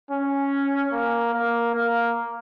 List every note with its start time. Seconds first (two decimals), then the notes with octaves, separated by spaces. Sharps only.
0.11 C#4
0.93 A#3
1.34 A#3
1.74 A#3